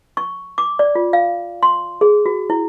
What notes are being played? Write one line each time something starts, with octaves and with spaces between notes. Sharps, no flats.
C#6
D6
D5
F4
F5
C6
G#4
F#4
E4